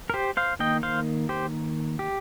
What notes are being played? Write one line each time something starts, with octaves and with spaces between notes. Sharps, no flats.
A#4
G4 C5
C5 F5
D#3 A#3 D#5 G5
C5 F5
G4 C5
G4